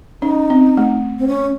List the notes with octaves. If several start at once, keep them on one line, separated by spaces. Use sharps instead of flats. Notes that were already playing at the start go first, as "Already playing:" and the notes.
C#4 D#4
C4
A3
C4
C#4